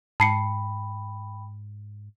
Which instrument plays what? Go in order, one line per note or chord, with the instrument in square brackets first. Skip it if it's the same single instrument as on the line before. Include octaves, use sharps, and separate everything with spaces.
[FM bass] G#2 [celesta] G5 B5 [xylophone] A5 C7 C#7